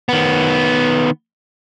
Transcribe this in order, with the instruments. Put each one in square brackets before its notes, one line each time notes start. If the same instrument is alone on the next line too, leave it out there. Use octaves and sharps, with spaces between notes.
[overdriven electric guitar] D#3 B3